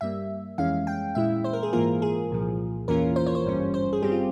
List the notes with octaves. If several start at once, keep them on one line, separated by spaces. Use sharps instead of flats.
G2 G3 A#3 E5
F2 E3 G#3 C#4 F5
G5
A#2 G#3 E4 E5
C5
A#4
G#4
G#2 E3 A#3 F4 A#4
G#4
C2 A#2 F3
E2 E3 A#3 C#4 F4 A#4
C5
C#5
C5
G#1 G2 G3 C#4
C5
G#4
G1 G2 G3 C4 G4
F4